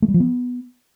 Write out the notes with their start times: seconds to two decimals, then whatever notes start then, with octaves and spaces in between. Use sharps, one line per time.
0.02 A3
0.08 G3
0.14 F3
0.20 B3